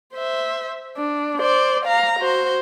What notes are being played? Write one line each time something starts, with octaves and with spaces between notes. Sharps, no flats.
C5 E5
D4
C5 D5
F5 A#5
F#4 C5